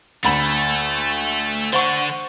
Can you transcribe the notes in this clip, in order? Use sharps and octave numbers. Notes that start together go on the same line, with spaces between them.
D2 A3 B5 F#7
D3 C5 F#5 C#6